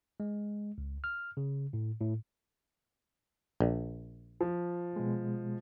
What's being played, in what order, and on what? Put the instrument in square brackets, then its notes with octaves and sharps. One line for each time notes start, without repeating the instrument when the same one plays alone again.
[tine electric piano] G#3
C#2
F6
C#3
A2
A2
[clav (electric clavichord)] A#1
[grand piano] F3
[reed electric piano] B2 G#3